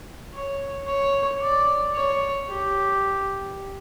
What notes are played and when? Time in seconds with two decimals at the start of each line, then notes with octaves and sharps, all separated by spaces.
0.34 C#5
0.87 C#5
1.41 D5
1.94 C#5
2.48 G4